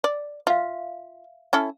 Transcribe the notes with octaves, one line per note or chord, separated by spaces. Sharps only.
D5
F4 E5 F5
C#4 E4 A4